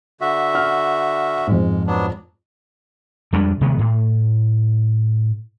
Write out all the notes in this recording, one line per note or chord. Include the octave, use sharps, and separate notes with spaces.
D3 F#4 E5
F6
F2 G#2 G#3
F#3 B3 D4
F2 G3 G#3 D4
C3 D#3 G#3 B3
A2